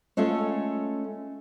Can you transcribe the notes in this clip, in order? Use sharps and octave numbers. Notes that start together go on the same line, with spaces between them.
G#3 A3 C#4 F4 A4 F5